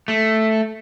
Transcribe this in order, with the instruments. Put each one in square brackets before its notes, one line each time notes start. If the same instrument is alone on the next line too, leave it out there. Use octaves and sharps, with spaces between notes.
[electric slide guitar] A3